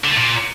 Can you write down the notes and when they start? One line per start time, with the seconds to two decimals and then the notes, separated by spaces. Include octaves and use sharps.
0.04 D3
0.10 A3
0.17 A#2